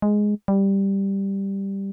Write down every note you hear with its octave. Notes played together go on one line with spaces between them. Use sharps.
G#3
G3